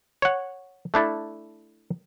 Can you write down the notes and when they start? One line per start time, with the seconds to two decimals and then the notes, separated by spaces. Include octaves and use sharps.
0.22 C#5 F#5
0.94 A3 D4 E4 A4